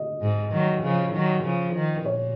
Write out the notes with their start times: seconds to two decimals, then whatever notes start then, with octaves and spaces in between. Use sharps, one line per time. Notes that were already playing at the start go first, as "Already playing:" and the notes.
Already playing: D#5
0.22 G#2
0.52 D#3 F#3
0.83 C#3 F3
1.13 D#3 F#3
1.44 C#3 F3
1.74 D#3
2.05 A#2 C#5